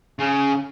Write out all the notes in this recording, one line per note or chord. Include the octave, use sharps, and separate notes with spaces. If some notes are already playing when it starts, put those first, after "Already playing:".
C#3